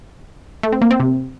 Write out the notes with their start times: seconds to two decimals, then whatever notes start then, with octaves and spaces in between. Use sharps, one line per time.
0.63 A3
0.73 C4
0.82 A#3
0.91 C4
1.00 C3